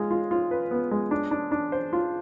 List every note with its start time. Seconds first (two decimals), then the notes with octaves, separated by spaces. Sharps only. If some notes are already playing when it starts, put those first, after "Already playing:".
Already playing: G#3 F4
0.11 F4
0.31 F4
0.51 B4
0.71 B3
0.91 G#3
1.11 D4
1.31 D4
1.52 D4
1.72 C5
1.93 F4